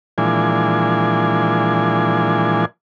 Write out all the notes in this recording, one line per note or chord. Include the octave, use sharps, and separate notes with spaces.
A#2 E3 F3 G#3 D4 G#5